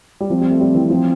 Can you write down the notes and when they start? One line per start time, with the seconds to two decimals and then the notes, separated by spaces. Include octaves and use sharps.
0.20 G3
0.29 F3 C4
0.41 G3
0.50 A3
0.60 G3
0.75 E3
0.90 F3 C4